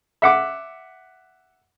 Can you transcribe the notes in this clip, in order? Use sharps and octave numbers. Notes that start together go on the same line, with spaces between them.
E5 F#5 D6